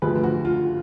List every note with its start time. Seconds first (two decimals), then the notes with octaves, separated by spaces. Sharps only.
0.02 D2 D3 F3 G#4 B4
0.24 F#4
0.45 F4